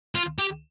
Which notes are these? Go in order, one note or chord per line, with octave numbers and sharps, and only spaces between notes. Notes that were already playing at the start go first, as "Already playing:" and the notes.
F4
G4